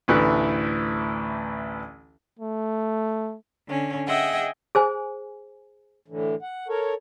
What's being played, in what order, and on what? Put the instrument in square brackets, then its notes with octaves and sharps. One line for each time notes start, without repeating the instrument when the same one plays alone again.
[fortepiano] A1 D2 E3 E4 B4 F#6
[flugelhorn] A3
[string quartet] D3 C#4
G#4 D#5 E5 F#5 G5
[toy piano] G#4 C5 G#5
[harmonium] A2 D3 E3
F#5
A4 A#4 C#5